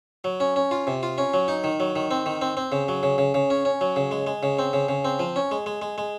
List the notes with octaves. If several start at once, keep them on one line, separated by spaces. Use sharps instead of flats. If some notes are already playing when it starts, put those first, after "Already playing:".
F#3
C#4
C#4
F4
C3
F4
C#4
F#3
D#4
D#3
F#3
D#3
C4
D#3
C4
C4
C#3
F#3
C#3
C#3
C#3
C#4
C#4
F#3
C#3
G#3
G#3
C#3
C4
C#3
C#3
C4
F3
C#4
G#3
G#3
G#3
G#3